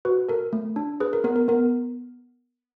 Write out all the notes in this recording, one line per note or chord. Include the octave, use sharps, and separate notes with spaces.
F#4 B4
A4 A#4
A3
D4
G#4 B4
A#4
B3 A#4
A#4
B3 A#4